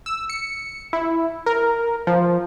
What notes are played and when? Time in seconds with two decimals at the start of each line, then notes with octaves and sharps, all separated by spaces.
0.06 E6
0.30 C#7
0.93 E4
1.46 A#4
2.07 F3